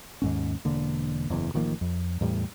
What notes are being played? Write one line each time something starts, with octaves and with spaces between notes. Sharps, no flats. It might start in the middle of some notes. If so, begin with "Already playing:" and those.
D#2 G#2 C#4
E1 D3 A#3
F#1 E2
A1 D#3 F3 A#3
F2
E2 A2 G3